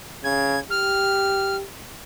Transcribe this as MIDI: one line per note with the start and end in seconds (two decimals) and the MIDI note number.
0.24 0.57 49
0.24 0.60 92
0.70 1.64 67
0.70 1.56 89